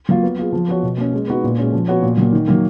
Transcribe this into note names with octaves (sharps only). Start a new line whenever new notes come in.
F#3 A#3 F4
B3
F4 G#4
F3
B3 F#4 C#5
B2
A#3 C#4
G#3
B3 D#4 F#4 B4
A#2
G#3 C#4
F3
B3 F#4 C#5
A#2
F#3 A#3
D#3
F#3 A#3